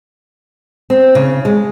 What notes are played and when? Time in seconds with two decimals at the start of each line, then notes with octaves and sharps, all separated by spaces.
0.90 C4
1.15 C#3
1.45 G#3